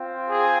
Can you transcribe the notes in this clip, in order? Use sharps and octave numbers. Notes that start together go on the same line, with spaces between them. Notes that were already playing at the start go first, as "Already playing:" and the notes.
Already playing: C4 F4
G#4